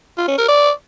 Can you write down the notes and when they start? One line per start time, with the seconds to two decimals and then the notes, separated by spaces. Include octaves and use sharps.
0.18 F4
0.28 C#4
0.38 A#4
0.48 D5